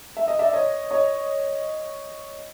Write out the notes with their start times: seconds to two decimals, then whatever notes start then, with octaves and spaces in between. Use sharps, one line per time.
0.17 E5
0.28 D#5
0.39 D5 E5
0.53 C#5 D#5
0.91 C#5 D#5